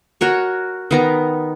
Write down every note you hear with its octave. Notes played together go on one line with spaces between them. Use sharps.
F#4 A#4 C#5
D#3 B3 A#5